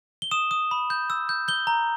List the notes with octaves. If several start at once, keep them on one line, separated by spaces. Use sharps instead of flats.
G7
D#6 E7
D#6
B5
G6
E6
G6
G6 G7
A#5